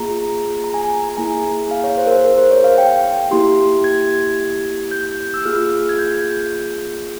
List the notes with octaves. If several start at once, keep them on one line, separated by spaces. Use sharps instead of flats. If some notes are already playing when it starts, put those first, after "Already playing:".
Already playing: A#3 F4 G#4 A#5
A#5
G#5
A#5
A#5
A#3 E4 G#4 G#5
F5
C#5
C5
A#4
C5
A#4
C5
C#5
F5
G5
A#3 E4 G4 C6
G#6
G6
E6
A#3 F4 G#4 F6
G#6
G6